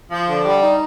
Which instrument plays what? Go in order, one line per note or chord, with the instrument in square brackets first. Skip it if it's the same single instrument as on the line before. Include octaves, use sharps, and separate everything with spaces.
[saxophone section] F3
D3
G3
D#4